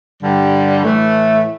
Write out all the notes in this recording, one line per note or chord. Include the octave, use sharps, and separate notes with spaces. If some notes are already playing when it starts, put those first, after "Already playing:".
G2 D3 G3
A2 E3 A3